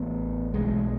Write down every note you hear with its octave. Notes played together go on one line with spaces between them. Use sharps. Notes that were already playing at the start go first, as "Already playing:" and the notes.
Already playing: A1 A2 B3
B1 B2 G#3